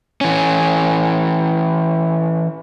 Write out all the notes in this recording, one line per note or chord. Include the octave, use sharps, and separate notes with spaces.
E3 C#4